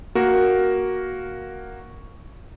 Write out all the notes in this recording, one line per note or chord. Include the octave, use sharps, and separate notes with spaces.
A#3 F#4 A#4